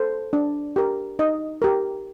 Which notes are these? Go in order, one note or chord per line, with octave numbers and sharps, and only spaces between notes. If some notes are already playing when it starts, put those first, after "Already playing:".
Already playing: A4 C5
D4
G4 A#4
D#4 D#5
G4 A#4